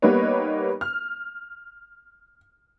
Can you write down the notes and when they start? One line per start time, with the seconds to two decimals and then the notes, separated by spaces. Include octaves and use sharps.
0.02 G3 A#3 B3 D#4 B4 C#5
0.81 F6